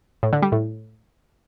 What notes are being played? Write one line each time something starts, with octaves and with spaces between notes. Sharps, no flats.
A2
D3
G3
A2